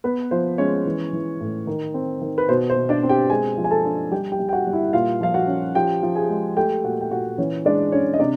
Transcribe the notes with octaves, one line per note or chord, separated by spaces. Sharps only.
B3 B4
F3 C5
G#3 C#4 C#5
E3
E3
A2
D#3
C4
D#3
B4
B2 C5
C5
B2
D4 D5
C4
G4 G5
G#3 G#4 G#5
F3
G#5
A4 A5
D4
G3 G4 G5
G4 G5
G3
G5
F#4 F#5
G3
E4 E5
A#2 F4 F5
F3 F5
F#4 F#5
C#4
F3 G4 G5
F3
G#4 G#5
G#3
A3 G4 G5
A#2 F#4 F#5
G5
A#2 F#4 F#5
E3 C#4 C#5
G#3 D4 D5
C#4 D4 C#5
D#5
C3 D4 D5